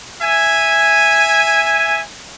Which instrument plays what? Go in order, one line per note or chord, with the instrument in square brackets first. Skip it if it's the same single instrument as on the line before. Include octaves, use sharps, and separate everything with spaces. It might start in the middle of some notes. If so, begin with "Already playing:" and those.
[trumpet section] E5 G#5